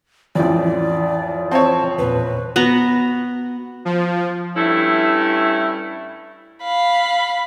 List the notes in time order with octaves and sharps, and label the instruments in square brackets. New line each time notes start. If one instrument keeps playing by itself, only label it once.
[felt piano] A1 F2 [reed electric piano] E3 E4 [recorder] D5
[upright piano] C4 C#5 [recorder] A5
[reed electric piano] E2 A#2 [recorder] B4
[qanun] B3 F#4 A#5
[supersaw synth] F3
[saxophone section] G2 A3 C#4 E4
[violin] F5 B5